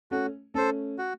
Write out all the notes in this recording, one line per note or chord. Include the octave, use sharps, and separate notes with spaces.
A3 C#4 F#4
A3 C#4 A4 C5
F#4